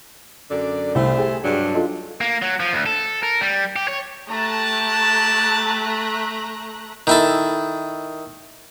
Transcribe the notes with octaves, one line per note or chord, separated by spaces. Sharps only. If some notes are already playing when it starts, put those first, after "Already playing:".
F#2 D3 D5
C2 A3 C5
G4 G#4
G2 F#3 D4
D#4 F4 A4
A#3
F#3
F3
D2
A4
A#4
G3
G4
C#5
A3 G4 A5 A#5 F#6
D#3 E4 A4